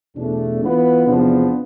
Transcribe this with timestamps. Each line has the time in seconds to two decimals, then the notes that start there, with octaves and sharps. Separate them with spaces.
0.15 E2 B2 A3 D4
0.62 E3 B3 F4 B4
1.07 E2 C3 F3 B3 D4